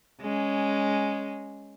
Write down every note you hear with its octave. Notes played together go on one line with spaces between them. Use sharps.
G#3 C#4